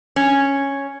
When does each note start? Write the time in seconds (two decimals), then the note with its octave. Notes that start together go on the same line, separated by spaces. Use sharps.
0.16 C#4